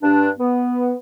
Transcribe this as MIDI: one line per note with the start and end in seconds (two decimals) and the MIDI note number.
0.03 0.29 43
0.03 0.29 62
0.38 0.94 59